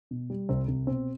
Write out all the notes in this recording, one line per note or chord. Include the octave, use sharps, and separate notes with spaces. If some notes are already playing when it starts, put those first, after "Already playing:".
B2
G3
C2 C4
C2
B2 C4